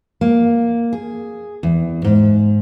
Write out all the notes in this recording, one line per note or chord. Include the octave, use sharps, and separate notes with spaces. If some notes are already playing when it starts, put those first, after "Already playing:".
A#3
G#4
E2
G#2